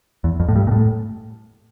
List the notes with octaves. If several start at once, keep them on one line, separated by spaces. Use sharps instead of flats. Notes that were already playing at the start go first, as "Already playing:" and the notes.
E2
F2
A2
G2
A#2
A2